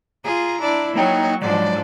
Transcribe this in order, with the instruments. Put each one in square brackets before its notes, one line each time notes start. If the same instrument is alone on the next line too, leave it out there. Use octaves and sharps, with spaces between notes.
[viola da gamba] F4 G#4 [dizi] A#5
[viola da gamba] D4 E4 D5
[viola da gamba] F#3 C#5 [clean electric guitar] A#3 G5 [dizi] D#4
[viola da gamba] G#2 F3 D4 [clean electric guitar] F#3 G#3 [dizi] D5